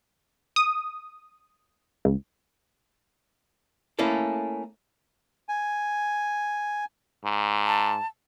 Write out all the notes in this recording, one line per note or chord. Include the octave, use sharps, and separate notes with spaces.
D#6
C#2
A3 A#3 C#4 E4 A4
G#5
G#2
A5